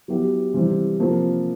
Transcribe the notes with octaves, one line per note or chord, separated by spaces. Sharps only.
F#3 B3 E4 G4
C3 E3 G3 C4
C3 F3 A#3